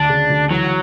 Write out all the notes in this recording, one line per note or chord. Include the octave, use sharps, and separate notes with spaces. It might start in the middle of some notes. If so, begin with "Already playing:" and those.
Already playing: D2 D4
C#3
D2
E3 F#3